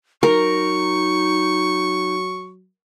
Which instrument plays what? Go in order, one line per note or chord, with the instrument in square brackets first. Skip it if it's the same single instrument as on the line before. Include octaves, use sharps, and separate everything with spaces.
[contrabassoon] F#3 [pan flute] D#4 [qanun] A#4 [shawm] C#6